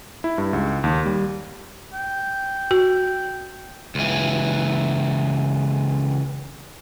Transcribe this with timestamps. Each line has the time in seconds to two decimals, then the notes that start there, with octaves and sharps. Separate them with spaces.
0.24 E4
0.38 G2
0.53 C#2
0.84 D#2
1.06 G3
1.93 G5
2.71 F#4
3.95 C#2 E3